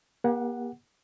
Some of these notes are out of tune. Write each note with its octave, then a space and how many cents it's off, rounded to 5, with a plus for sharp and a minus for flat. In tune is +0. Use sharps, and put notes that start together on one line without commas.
A#3 +40 G4 +30 F#5 +0